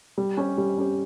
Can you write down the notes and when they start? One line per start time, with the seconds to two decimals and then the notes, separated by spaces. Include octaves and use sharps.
0.18 G3
0.37 C#4 G4
0.58 G3
0.78 C#4 G4